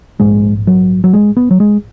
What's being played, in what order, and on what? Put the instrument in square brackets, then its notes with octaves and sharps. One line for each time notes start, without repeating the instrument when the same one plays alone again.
[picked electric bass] A#1 G#2 G#3
F#3
F#3
G#3
B3
F#3
G#3